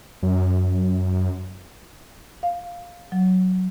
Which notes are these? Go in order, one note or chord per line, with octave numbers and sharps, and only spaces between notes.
F#2
F5
F#3